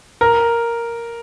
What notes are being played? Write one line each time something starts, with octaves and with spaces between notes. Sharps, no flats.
A#4